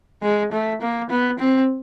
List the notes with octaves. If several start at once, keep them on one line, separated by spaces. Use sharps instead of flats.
G#3
A3
A#3
B3
C4